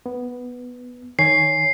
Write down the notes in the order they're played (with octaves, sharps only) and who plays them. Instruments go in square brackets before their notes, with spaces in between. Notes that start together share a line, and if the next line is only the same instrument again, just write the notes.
[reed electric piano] B3
[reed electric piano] D#3 C#5 G#5 [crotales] C7